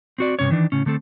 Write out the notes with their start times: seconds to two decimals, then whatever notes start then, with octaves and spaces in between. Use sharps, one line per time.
0.18 C4 F#4 D5
0.39 G2 C3 C#4 C#5
0.51 D#3 E3 D4
0.72 A2 C#3 C#4
0.86 D3 A3 C4 A4